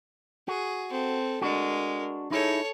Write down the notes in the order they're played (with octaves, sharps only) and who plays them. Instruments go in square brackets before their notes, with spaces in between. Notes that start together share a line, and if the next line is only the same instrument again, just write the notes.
[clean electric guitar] F#4 [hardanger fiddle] G#4
[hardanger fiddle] C4 A4
[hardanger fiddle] G#3 A#4 [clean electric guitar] D4 F#4
[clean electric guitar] D#4 E4 G#4 [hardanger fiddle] A4 C#5